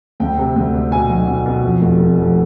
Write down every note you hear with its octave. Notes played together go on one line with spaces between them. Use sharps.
D2 G5
C3
D2
D2
B2 G#5
B1
B2
B2
F2
F1
F1
F2